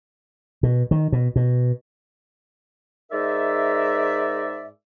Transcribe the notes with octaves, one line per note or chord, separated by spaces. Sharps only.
B2
D#3
B2
B2
G#2 G#3 D#4 A#4 D5 E5